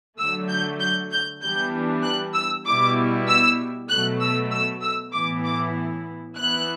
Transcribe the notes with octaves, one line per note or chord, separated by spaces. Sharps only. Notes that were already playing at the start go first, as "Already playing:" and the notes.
D3 F#3 A3 E6
G6
G6
G6
E3 G3 B3 D4 G6
F#6
E6
B2 G3 B3 E4 D6
E6
B2 F#3 A3 F#6
E6
E6
E6
A2 E3 B3 E4 D6
D6
E3 B3 E4 F#6